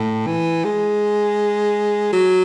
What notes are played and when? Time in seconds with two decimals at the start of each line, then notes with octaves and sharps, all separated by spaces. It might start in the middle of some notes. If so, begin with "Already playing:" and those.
Already playing: A2
0.27 E3
0.64 G#3
2.13 F#3